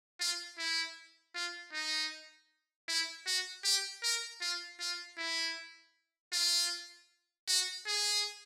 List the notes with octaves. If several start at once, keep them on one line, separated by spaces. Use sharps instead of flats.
F4
E4
F4
D#4
E4
F#4
G4
A#4
F4
F4
E4
F4
F#4
G#4